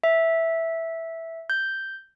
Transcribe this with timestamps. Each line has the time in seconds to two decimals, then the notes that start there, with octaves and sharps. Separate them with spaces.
0.04 E5
1.50 G6